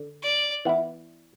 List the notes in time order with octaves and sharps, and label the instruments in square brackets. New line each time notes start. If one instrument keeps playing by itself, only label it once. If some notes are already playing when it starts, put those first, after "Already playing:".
Already playing: [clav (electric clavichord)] D3
[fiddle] D5
[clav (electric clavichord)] E3 B3 E4